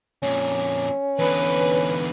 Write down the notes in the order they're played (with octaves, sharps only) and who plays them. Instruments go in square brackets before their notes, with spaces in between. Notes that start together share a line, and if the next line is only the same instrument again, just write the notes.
[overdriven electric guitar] F2 A#2 [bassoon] C#4
[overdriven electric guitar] E2 D3 [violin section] B4